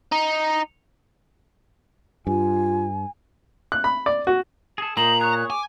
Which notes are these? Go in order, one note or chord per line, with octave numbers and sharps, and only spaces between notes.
D#4
G2 F4 G#5
F#6
B5
D5
F#4
G#4 A4
A#2 C5 D#5 A#5 F#7
G#4 C#5 F#6
G#5 D6